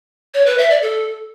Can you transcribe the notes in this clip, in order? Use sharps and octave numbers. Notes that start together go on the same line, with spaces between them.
C#5
B4
E5
D5
A4